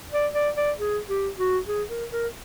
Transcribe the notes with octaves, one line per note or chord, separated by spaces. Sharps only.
D5
D5
D5
G#4
G4
F#4
G#4
A#4
A#4